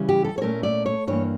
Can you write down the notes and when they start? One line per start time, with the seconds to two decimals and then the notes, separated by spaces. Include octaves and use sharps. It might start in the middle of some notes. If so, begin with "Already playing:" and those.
Already playing: C#3 E3 G3 C#4
0.09 G4
0.24 A4
0.38 C#5
0.41 A#2 A3 C#4 A#4
0.63 D5
0.86 C#5
1.07 G2 E3 A#3 C#5